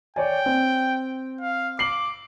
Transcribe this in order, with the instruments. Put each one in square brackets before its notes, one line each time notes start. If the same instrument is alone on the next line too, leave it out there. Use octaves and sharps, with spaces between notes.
[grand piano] C#5 D5 G#5 [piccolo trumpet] G5
[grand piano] C4
[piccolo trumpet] F5
[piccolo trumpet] D6 [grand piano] C7 F#7